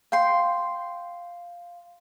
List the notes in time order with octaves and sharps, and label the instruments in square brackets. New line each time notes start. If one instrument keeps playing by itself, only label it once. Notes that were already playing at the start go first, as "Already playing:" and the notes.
[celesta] F5 [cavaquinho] G5 C6